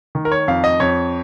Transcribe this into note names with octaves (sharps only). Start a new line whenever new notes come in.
D#3
A#4
C#5
F2 F5
D#5
F2 C#5